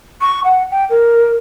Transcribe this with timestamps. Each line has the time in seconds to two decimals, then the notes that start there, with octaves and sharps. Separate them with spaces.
0.21 C#6
0.44 F#5
0.71 G5
0.89 A#4